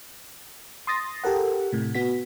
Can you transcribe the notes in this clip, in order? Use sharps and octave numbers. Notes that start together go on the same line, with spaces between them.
C6 D#6 A6 A#6
G4 A4 A#4 F#5
A2 C3
B3 F#4 B6